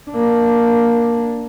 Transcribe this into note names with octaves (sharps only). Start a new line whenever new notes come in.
A#3 D4